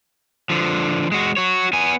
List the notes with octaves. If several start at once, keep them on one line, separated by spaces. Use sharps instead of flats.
D3 F3
G#3 F#4
F#4 C#5
B3 G#5